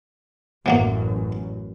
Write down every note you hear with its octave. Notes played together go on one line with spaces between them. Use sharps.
A1 F#2 E3 F#3 A#3